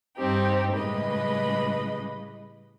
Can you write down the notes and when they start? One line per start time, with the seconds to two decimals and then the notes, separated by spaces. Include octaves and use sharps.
0.16 G2 G3 C4 D#4 G4
0.73 A2 C#3 G3 G#3 B4 D#5